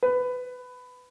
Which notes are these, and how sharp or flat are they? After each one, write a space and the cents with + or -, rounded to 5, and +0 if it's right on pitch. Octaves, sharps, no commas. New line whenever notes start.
B4 +15